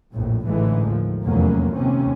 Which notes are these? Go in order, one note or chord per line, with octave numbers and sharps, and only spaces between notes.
A#1 F2 A2
A1 G#2 D3 E3 G#3 A3
D#2 F3
F1 E2 F#3 A#3 C#4
D#2 C3 C4 C#4